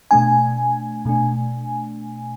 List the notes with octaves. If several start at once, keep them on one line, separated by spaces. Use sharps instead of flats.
B2 A3 D4 G#5
B2 A3 D4